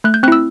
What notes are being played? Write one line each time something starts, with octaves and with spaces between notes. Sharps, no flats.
A3 F#6
G6
C4 E4 E6 F#6